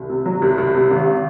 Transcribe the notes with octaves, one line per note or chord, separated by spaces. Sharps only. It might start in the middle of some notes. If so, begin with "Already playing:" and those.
Already playing: C2
C3
F#3
C2
C2
C3
G#1